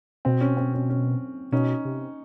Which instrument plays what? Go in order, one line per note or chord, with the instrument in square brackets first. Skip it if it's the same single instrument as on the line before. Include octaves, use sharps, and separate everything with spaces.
[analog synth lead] B2 [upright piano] C4
[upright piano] C#4
C4
C#4
C#4
[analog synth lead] B2 [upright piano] C#4 D#4
[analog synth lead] C3